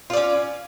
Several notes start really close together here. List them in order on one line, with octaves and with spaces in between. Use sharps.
F4 D5 C#4